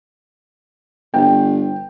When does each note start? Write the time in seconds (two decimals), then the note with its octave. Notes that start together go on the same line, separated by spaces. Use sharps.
1.14 G1 G5